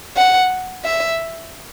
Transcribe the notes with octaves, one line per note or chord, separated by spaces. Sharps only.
F#5
E5